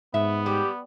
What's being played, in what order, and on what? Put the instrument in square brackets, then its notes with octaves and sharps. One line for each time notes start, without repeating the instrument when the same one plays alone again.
[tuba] G#2 [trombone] B3 [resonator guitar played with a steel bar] E5
[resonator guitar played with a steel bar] G3 [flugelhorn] G4